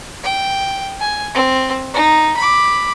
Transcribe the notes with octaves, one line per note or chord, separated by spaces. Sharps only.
G5
G#5
C4
D#4
B5 D6